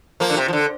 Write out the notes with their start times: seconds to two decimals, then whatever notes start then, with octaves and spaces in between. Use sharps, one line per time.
0.20 F3 A#3
0.30 D3
0.37 C3
0.48 F3
0.53 D3